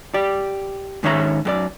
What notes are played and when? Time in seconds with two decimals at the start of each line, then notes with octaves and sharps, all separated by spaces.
0.14 G4 D5
1.03 G#2 D#3 C#4 C#5 E5 A#5
1.45 F#2 G4 D5